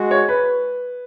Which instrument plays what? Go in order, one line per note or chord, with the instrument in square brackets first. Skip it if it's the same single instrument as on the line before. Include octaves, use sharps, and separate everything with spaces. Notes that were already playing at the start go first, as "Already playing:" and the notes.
Already playing: [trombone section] G#3 F#4
[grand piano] C#5
B4